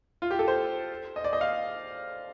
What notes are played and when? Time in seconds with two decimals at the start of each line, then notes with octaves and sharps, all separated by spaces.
0.22 F4
0.31 G4
0.39 A4
0.48 C5
1.16 D#5
1.24 D5
1.33 D#5
1.41 F5